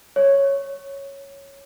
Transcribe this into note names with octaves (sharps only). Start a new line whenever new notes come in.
C#5